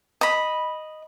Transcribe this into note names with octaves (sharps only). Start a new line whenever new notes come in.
D#5 B5